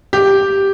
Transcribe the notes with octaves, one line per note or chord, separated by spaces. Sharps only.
G4